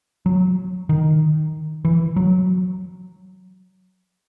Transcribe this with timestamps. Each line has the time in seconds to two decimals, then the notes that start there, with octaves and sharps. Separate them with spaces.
0.26 F#3
0.89 D#3
1.85 E3
2.16 F#3